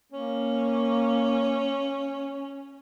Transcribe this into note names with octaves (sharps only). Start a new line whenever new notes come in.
A#3 C#4